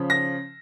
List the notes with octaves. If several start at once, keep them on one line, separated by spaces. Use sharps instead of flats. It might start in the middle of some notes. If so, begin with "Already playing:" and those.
Already playing: C#3 F3
A#6